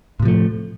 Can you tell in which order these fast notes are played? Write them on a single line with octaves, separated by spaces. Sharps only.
A2 C3 F3 A3